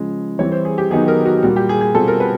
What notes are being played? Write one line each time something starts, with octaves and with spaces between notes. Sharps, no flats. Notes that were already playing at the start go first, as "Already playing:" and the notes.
Already playing: C#3 F3 G#3
E3 G3 C4 C#5
C5
G#4
G4
D#3 F#3 B3 D#4 G4 G#4
A#4
F#4
A#2 G3 A#3 F#4
G4
G#4
G#4
B2 G3 C4 F4 A4
A#4
B4